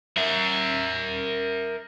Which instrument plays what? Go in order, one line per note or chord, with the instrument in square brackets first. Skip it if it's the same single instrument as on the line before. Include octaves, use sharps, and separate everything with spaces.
[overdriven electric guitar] A#4 E5